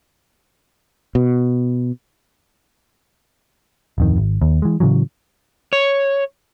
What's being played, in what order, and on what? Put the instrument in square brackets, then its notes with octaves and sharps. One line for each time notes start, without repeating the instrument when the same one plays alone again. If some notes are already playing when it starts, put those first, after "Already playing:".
[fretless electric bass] B2
[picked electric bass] D1 F2 D#3
G#1
D#2
E3 G#3
A2 C#3 E3 F#3
[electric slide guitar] C#5